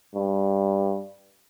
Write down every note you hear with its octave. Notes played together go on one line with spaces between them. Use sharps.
G2